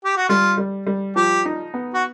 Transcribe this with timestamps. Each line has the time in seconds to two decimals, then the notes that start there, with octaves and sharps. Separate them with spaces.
0.05 G4
0.17 F#4
0.29 G3 F4
0.57 G3
0.87 G3
1.16 F3 G4
1.45 D#4
1.74 B3
1.94 F#4